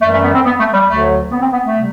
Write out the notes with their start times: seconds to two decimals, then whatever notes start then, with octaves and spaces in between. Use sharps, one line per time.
0.01 F#2 E3 G3 A3
0.13 A3
0.23 B3
0.34 C4
0.45 B3
0.59 A3
0.74 G3
0.88 D2 D3 F#3 A3
1.31 B3
1.41 C4
1.53 B3
1.64 A3
1.75 C3 G3